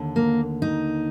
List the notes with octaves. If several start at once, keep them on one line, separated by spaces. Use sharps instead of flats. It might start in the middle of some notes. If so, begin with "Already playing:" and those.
Already playing: D#2 D3
A#3
D#4